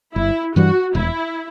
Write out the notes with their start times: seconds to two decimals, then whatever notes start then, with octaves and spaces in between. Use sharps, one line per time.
0.16 G1 E4
0.56 G2 E3 G3 F#4
0.95 E1 E4